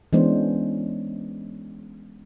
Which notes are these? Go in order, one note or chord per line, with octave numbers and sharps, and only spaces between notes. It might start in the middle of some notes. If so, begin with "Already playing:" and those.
E3 G#3 B3 C#4 D4 C5